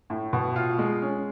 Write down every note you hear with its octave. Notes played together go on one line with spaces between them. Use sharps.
A2
B2
F4
G#3
C#4